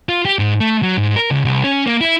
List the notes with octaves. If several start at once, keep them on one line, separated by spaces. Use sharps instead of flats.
F4
G4
G#2
A3
F#3
G#2
A#4
C#2
C2
C#4
A#3
E4